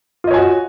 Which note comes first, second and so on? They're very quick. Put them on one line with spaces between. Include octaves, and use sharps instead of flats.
F4 D#5 C#5 G#5 F#4